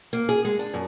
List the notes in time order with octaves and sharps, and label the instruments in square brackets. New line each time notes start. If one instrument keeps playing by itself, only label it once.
[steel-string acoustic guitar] A#3
G#4
G#3
D4
F#2